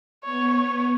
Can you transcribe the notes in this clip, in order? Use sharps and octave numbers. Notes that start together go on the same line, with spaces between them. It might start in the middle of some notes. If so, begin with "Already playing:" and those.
B3 C#5
C#5